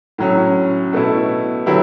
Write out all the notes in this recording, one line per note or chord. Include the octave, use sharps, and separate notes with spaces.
A2 F#3 C#4
B2 A3 E4
D3 F#3 B3 E4 G4